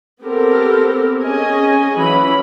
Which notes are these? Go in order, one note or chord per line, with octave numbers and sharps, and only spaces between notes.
B3 C4 G4 A4 A#4
C#4 G#4 D#5 G#5
E3 F#3 C#4 B5